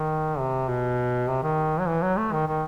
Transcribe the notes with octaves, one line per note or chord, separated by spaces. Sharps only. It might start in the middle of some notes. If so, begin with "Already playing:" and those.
Already playing: D#3
C3
B2
C3
D#3
F#3
E3
F#3
A3
D#3
D#3